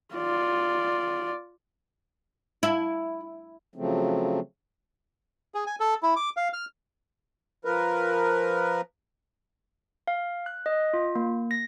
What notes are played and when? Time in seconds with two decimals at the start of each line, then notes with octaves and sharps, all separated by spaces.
0.15 F4 D5
2.63 E4
3.76 C#3 F3 F#3 A3 C4
5.54 G#4
5.66 G#5
5.80 A4
6.03 E4
6.16 D6
6.37 F5
6.53 F6
7.65 F3 A#4 B4
10.08 F5
10.46 F#6
10.66 D#5
10.93 F4
11.15 A#3
11.51 A#6